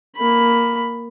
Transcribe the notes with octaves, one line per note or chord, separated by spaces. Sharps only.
A#3 B5